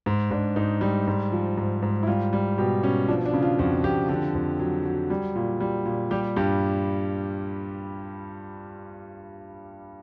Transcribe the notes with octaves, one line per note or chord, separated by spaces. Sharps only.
G#2
G#2 D4
G#2 D#4
G3
G#2
F3
G#2
G#2
E4
G3 F4
G3
B2 G4
B2 C#4
F3 D4
D4
C#3
F4
F2 F#4
F2 G4
D3 G4
F2
F#3
F#3
G3
A#2
G3
A#2
G3 G4
G2 G4